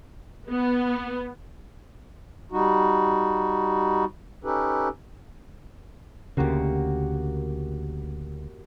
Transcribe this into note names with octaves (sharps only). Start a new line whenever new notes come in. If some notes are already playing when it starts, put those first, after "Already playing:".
B3
G3 D#4 F#4
C#4 D#4 G4 A4 B4
D2 C#3 A#3 F#4 G4